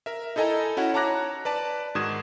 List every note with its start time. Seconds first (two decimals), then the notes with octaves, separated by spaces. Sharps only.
0.06 A#4 E5
0.36 D#4 E4 A4 D#5 G#5 A#5
0.77 C#4 E4 F#4 F#5
0.94 C#5 A5 A#5 D6 F#6 A#6
1.45 B4 D5 A5
1.95 G#2 D#3 F#4 D#6 G#6 E7